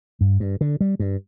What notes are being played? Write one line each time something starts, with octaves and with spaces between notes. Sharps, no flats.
G2
G2
D3
G3
G2